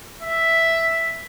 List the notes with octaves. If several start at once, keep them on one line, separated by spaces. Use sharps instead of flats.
E5